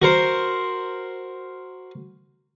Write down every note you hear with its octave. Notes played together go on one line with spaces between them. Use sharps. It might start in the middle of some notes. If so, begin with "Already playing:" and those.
F#4 A#4 C5